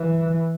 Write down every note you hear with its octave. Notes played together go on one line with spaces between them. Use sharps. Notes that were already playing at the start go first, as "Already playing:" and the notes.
Already playing: E3